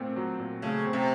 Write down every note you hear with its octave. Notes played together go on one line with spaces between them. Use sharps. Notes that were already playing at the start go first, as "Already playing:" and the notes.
Already playing: A#2 A3 C4
F#3
A#2
C#3 A3
C4
C3